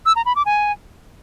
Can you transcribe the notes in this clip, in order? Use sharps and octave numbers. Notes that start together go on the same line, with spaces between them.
E6
A#5
B5
D6
G#5